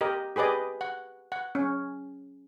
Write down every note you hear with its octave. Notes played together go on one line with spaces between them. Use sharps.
G4 A#4 D#5
G4 G#4 B4 D5 D#5
F#5
F#5
C#4